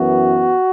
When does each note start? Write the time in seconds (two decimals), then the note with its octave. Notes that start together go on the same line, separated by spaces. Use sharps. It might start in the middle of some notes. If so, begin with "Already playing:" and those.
Already playing: F#2 E3 B3 F#4